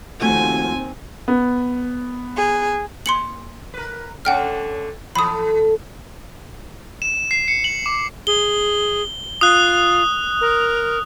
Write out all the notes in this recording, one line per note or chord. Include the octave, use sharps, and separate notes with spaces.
D#2 F3 A3 C4 F#4 G#5
B3
G#4
A#3 C6 C#7 F#7
A#4 B4
D3 A3 C#4 F#5 G5 F6
E3 A4 B5 D#6
E7
C7
C#7
F#7
D6
G#4 G7
F4 D#6 F#6
A#4